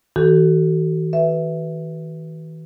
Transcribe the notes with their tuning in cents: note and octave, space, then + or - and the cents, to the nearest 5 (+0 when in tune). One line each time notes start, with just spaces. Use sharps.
D#3 +45 F#4 +30 A4 +0
B4 +0 E5 +0